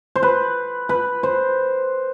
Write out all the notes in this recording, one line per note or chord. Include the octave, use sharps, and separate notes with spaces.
C5
B4
B4
C5